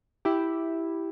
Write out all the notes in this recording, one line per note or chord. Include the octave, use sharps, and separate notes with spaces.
E4 G4